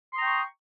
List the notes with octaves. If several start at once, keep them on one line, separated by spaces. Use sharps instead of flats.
G5 A#5 C6 C#6 D#6